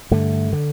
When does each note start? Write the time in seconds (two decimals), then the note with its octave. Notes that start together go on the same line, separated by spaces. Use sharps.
0.11 G2 D3 A3
0.53 D3